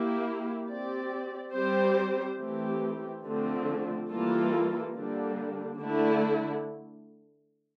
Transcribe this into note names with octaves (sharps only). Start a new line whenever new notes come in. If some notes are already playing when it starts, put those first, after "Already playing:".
Already playing: A#3 E4 G4
C4 G4 D5
G3 C4 G4 C5
E3 A3 C4 G4
D3 F3 A3 C4
E3 G3 A#3 F4 A4
D3 G3 A#3 D4
D3 A3 E4